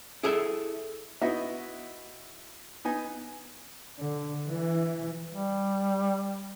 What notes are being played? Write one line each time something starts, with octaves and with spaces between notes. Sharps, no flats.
E4 G#4 A4 E5
B3 D#4 E4 F#4 D#5 E5
B3 D#4 G#5
D3
E3
G3